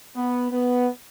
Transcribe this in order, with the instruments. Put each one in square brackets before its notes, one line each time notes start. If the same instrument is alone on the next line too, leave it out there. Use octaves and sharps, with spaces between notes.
[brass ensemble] B3
B3